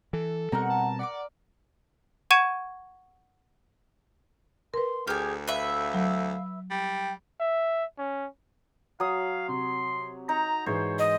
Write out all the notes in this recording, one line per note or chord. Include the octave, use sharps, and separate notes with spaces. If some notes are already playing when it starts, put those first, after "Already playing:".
E3 A4
B2 G3 C4 D#4 F#4 A#4 F#5 A#5
A5
D5 F#5 B5 D6
F#5 C#6 G#6 D#7 E7
A#4 B4 C6
D2 G4 G#4 G#5 F6
B4 E5 F5
F#3
G3 G5
E5
C#4
F#3 F5 D#6
C3 C6
D#4 A#5
G#2 E3 G#3 C5 C#5
D#5